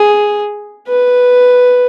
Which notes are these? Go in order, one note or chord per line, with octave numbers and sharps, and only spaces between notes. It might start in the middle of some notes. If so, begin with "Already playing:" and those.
Already playing: G#4
B4